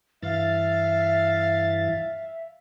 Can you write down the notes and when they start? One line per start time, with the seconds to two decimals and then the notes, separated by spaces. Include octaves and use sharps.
0.23 G2 E3 E5 F5 A6